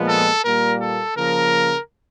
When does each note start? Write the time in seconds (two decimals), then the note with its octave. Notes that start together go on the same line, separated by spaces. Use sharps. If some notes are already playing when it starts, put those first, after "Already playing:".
Already playing: A#2 F3 G#3 B3
0.08 A4
0.44 A#2 G3 A#3 A#4
0.81 A4
1.16 C#3 F3 A#3 A#4